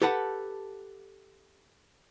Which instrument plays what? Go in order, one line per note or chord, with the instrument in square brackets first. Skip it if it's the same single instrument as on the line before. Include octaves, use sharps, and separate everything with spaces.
[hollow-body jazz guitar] G4 A4 B4 F#5 G5 A5